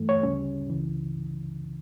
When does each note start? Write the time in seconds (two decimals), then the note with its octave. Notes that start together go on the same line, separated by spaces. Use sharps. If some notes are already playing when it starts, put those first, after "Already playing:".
Already playing: G2 E3 A3
0.09 C#5
0.23 D2 C#3 G3 C#4
0.69 C#2 C#3 E3